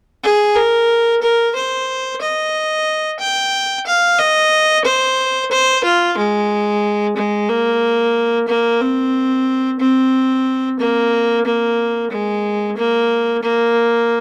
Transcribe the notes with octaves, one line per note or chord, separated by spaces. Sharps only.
G#4
A#4
A#4
C5
D#5
G5
F5
D#5
C5
C5
F4
G#3
G#3
A#3
A#3
C4
C4
A#3
A#3
G#3
A#3
A#3